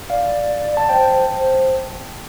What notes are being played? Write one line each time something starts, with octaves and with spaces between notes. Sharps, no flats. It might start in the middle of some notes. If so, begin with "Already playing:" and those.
D5 F5
A5
C5 G5
C5